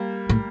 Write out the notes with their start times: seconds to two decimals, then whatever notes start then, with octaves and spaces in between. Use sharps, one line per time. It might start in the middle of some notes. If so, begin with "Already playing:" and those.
Already playing: G3 A#3
0.29 A2